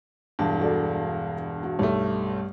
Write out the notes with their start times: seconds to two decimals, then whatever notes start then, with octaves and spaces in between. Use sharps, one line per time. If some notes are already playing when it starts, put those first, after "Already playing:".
0.39 E1 G2 A5
0.59 F#4 A4 D5
1.63 F#4
1.79 B1 G2 A3